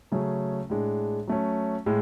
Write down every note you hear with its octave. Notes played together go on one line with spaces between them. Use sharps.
C#3 F#3 A3 C#4 G#4
A2 G#3 D4
F#3 A3 C#4
A2 G#3